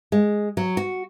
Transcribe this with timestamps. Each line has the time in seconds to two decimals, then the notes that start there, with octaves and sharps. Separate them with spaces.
0.12 G#3
0.57 F#3
0.77 F#4